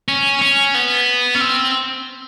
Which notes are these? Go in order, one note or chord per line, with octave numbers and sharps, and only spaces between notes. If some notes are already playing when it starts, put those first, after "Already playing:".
C#4
C#4
B3
C#4
C4